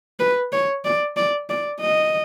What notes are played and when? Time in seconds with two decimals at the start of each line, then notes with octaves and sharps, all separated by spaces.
0.20 B4
0.52 C#5
0.85 D5
1.17 D5
1.50 D5
1.81 D#5